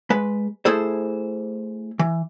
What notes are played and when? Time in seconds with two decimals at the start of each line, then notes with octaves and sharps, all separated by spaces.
0.10 G#3 B4
0.65 A3 E4 G#4 A4 C5
1.99 E3